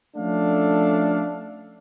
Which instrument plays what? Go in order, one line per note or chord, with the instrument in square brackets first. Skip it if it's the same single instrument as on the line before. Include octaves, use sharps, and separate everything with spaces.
[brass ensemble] F3 A3 C#4 D4 A4 F5